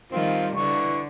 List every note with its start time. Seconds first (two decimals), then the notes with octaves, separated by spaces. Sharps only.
0.12 D#3 G3 C4 F4
0.57 D3 E3 C#6